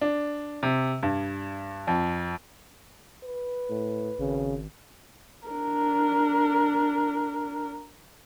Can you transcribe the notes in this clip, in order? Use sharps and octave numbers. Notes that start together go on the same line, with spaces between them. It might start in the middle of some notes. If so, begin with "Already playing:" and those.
D4
C3
G2
F2
B4
A2
G#1 C#3
D4 A#4